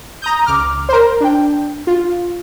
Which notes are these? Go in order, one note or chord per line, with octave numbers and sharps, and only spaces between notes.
A#5 D#6 G6
C#2 D6 F6
A#4 C5
D4 G5
F4